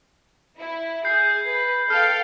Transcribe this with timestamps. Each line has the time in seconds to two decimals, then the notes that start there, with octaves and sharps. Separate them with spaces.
0.58 E4
1.05 G#4 G6 C7
1.46 B4
1.90 A4 F5 G5 F6 C7